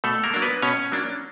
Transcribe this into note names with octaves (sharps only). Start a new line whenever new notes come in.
B2 A3 A4
A#3 A#4
F#3 A#3 D4
B3 B4
B2 C#4 C#5
F#3 A#3 D4